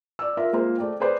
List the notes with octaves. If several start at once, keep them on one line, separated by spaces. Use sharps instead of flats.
D5 E6
F4 A#4 E5
G#3 A#3 F4 C5
A3 D5 G5
G#4 B4 C5 D5